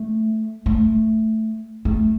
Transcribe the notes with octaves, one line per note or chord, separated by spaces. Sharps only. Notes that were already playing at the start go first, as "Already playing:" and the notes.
Already playing: A3
A3
A3